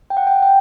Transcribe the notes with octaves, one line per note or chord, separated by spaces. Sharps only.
G5
F#5
G5
G5